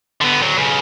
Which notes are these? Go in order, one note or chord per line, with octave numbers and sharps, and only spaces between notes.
D3 B3
D2 F#3
B1 C#3